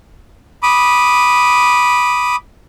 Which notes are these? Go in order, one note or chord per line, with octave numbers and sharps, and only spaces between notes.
B5 D6 D#6